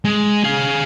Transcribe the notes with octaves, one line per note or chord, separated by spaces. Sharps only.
G#3
G#4 F5